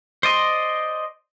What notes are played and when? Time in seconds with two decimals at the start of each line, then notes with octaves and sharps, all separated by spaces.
0.23 C5 D5 D#5 C6